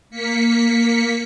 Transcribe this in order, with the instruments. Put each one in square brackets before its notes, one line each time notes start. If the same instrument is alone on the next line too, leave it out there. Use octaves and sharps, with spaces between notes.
[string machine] A#3 B6 C#7